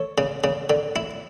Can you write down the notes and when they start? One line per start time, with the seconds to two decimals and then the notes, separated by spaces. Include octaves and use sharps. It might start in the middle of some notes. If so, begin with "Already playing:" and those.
Already playing: A4 C#5
0.18 C#3
0.44 C#3
0.70 D3
0.96 E4